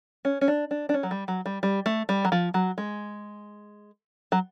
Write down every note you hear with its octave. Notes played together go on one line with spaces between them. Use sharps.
C#4
C#4
D4
D4
D4
C#4
F#3
G3
F#3
G3
G3
A3
G3
F#3
F3
F#3
G#3
F#3